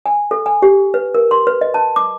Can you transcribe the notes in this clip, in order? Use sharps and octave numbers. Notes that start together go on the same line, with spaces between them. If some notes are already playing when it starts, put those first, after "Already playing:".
G#5
A4
G#5
G4
B4
A#4
C6
B4
D#5
A5
D6